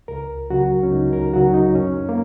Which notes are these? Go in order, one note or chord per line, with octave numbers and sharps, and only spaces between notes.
C#2 A#4
C#3 F#3 F#4
C#4
C#2 D#4
A#4
C#3 F#3 F#4
D#4
F#2 C#4
A#3